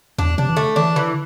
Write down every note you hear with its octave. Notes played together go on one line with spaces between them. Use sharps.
E2 D4
C3 D4
E3
D3 A3
E3 D4
D3 E3